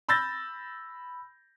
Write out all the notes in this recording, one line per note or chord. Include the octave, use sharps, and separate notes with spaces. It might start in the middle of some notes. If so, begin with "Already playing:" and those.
B5 E6 G6 A6 A#6